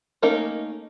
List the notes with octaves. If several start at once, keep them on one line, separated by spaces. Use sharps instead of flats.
A3 A#3 C#4 D#4 A#4